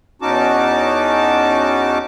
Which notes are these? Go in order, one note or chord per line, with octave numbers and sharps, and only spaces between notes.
E2 C#4 D#4 F#4 A5 D6